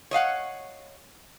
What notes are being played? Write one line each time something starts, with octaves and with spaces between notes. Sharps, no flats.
C#5 D#5 F5 F#5